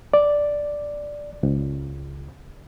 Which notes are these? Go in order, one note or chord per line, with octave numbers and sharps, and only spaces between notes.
D5
C#2